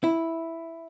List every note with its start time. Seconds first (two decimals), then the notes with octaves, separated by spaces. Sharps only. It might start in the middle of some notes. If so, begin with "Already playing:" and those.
0.04 E4